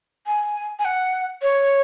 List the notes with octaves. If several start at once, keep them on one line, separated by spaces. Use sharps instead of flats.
G#5
G#5
F#5
C#5